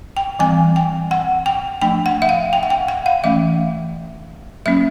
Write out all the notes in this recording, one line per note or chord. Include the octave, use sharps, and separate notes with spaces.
G5
E3 G3 C4 G#5
G5
F#5
G5
F3 A3 D4 G5
F#5
E5
F5
G5
F#5
G5
F#5
F5
E3 A3 C#4 E5
F#3 A#3 C#4 E5